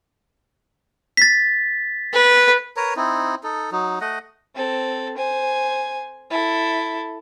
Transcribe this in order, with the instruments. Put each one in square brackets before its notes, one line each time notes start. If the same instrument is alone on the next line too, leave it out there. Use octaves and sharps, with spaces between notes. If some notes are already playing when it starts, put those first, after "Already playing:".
[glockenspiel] A6 B6
[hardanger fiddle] B4
[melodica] A#4 B4 C#5 A#5
C4 D#4 E4
D#4 A4
F#3 D#4
A3 D#5 F#5
[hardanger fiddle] C4 A4
C5 G#5
E4 A4